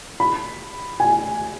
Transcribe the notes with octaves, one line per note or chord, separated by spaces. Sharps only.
B5
G#5